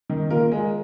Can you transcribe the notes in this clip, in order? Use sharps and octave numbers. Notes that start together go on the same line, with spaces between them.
D#3
A#3 F4 A#4
G#3